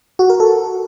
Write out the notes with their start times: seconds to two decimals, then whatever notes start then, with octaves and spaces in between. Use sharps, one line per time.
0.19 F#4
0.30 A#4
0.40 A4